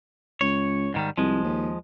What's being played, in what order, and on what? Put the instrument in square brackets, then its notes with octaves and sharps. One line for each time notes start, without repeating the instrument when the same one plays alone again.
[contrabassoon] C#2 [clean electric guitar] C#5
[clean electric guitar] G#2 D#3 G3
[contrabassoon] C2 [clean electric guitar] F3 G#3
[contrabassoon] D#2